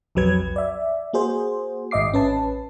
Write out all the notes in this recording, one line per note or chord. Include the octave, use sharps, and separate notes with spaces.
B1 F2 F#3 B4 G#6
D5 E5
A#3 F#4 G#4 C5
G#1 G#2 D#5 E5 D6 C7
A1 C#4 B4 A5